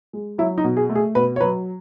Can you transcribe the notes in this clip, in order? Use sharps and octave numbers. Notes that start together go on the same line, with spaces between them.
G#3
F#3 E4
D#4
B2
G#4
A3
G#4
B2 B4
C#5
F#3 B4